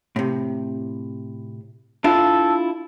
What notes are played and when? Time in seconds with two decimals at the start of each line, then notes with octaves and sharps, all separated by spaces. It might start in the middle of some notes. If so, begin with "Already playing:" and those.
0.16 A2 C3
2.04 D4 E4 F4 A4